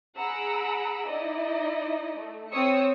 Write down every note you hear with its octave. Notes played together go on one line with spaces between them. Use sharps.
G#4 F#5 A#5 B5 E6 D7
D#4 E4 D5 D#5
A3
C4 C#5 D#6 E6 C#7